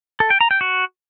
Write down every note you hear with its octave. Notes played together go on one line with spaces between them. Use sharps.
A4
G5
A#5
G5
F#4